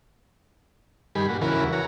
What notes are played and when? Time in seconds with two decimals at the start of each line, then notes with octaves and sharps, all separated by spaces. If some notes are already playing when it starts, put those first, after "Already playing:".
1.15 G2 D#3 G3 G#4 B5
1.29 A#2 F#4
1.41 E2 C#3 E3 F#4 A#4 B4
1.73 F#4 C#5 A#5